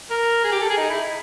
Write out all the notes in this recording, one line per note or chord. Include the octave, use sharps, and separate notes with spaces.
A#4
G#4
G4
A4
G#4
D#4
E4